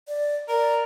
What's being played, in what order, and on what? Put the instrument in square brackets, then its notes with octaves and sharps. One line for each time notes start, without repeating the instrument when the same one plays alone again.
[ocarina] D5
[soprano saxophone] A#4 [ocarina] D5